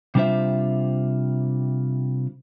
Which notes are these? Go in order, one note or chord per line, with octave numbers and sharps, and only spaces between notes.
C3 G3 D4 F4 C5 E5